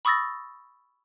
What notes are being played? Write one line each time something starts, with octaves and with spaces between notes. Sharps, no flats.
B5 C#6 D#6 E6 A6 A#6